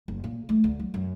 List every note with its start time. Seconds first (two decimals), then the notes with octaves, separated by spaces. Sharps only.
0.08 F#1
0.24 A#2
0.49 A3
0.64 D2
0.80 F#3
0.94 F#2